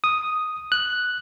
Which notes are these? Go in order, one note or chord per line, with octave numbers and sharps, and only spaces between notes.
D#6
F#6